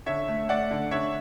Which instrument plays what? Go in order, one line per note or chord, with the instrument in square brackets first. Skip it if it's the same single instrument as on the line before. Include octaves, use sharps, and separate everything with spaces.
[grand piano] D3 C#5 E5
A3
A3 D5 F#5
D3
D3 C#5 E5